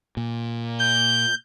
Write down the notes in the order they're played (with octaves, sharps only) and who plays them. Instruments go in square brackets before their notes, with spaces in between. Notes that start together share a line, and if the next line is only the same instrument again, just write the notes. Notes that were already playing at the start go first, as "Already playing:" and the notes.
[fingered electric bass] A#2
[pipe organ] G6